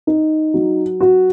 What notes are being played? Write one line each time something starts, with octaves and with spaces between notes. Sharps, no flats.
D#4
F#3
F#4